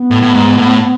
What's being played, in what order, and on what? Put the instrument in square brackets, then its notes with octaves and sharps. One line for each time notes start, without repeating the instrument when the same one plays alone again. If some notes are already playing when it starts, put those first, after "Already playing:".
Already playing: [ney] B3
[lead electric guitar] A2
A2
G#2
A2